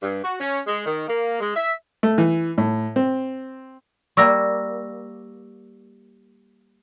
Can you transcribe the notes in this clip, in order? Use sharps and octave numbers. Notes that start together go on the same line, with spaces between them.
G2
F#4
C#4
G#3
D#3
A#3
G#3
E5
A3
E3
A2
C4
G3 A#3 C#6 E6 A#6